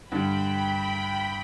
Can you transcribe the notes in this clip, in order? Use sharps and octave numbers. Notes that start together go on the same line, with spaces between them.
G2 D3 G3 G5 B5